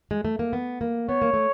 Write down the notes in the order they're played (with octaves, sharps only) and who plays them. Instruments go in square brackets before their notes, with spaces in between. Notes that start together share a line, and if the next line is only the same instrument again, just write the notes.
[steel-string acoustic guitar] G#3
A3
A#3
B3
A#3
[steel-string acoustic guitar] B3 [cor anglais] C#5
[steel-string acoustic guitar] A#3
A3